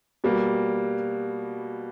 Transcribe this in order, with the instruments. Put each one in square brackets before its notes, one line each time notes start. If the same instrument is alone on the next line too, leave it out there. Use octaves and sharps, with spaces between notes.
[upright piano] B2 G3 A#3